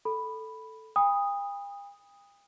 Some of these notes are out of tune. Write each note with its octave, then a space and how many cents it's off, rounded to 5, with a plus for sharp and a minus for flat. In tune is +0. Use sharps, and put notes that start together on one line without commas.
A4 +0 B5 +0
G5 +45 B5 +0 D#6 +0